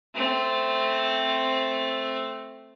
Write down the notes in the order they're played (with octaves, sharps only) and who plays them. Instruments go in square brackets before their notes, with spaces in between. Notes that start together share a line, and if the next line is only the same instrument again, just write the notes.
[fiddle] A3 C4